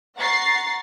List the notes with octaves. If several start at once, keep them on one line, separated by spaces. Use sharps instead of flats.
F#5 A#5 C#6 A6 C7